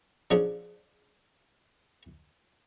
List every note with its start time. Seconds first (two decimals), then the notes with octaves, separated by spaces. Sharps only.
0.31 F3 C#4 D4 G#4